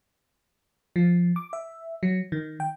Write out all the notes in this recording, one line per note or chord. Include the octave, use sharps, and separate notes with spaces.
F3
D6
E5
F#3
D#3
G5